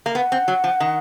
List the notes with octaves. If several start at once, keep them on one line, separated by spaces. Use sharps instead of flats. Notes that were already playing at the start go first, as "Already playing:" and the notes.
A#3
B3 F#5
C4
F#3
F3
D#3